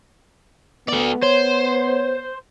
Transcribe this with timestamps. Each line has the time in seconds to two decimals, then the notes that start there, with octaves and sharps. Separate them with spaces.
0.88 A3 B3 D5
1.23 C5 C#5